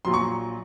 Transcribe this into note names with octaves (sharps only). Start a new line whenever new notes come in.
A#1 A#2 F#3 C6
C#6